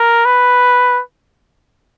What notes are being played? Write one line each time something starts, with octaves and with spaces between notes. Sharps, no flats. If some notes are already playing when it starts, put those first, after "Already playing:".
Already playing: A#4
B4